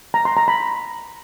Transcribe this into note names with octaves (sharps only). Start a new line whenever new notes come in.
A#5
C6
A#5
B5